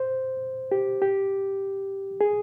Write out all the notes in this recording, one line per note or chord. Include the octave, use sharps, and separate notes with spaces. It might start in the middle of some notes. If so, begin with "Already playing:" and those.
Already playing: C5
G4
G4
G#4